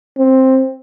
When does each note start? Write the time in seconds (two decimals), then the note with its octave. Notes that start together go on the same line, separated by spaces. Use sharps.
0.19 C4